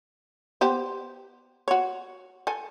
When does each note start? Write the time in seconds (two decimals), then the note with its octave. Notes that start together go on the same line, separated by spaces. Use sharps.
0.61 B3 G4 C5
1.68 F#4 C#5
2.47 A4 G#5